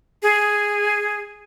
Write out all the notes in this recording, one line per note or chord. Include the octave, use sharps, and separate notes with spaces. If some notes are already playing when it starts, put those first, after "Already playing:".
G#4